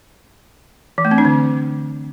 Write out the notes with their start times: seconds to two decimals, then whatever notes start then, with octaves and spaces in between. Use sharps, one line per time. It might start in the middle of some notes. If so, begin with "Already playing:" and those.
0.98 E3
1.05 A3
1.11 C4
1.18 D4
1.25 D3